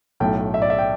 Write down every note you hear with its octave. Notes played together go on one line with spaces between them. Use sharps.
B1 A2 A3 G5
E5
D5
E5
G5